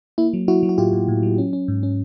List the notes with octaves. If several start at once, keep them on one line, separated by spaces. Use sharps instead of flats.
A#3 E4
F#3
F#3 E4 F#4
F#3
F#4
A2 F4 G4
A2
A2
F#3
C#4
C#4
G#2
C#4